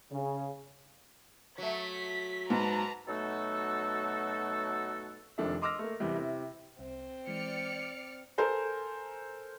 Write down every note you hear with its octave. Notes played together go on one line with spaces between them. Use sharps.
C#3
F#3 A3 B6
G#2 B4 A5 A#5
B2 F#3 A3 D#4 F#4 A4
F1 F2 D#3 D4 A4 E5
D#5 C6 D6 E6 F6 A#6
A3 A#3
E2 C3 G3
C3 E4
C2 C4
E3 G#3 D5 F6 C#7
A4 A#4 C5 G#5 A#5